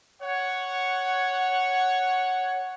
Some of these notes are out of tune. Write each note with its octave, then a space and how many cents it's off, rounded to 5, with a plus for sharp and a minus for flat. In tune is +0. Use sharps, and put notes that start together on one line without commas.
C#5 +0 F#5 +0